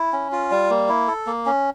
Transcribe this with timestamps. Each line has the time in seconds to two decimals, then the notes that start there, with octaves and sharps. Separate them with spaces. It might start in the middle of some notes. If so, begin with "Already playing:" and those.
Already playing: E4
0.13 C#4
0.32 F4
0.51 G3
0.70 A#3
0.89 E4
1.08 A4
1.27 A#3
1.46 C#4